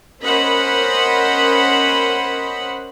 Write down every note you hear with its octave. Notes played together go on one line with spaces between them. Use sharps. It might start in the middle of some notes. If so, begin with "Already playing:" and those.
C#4 A#4 C5 D#5 F#5 B5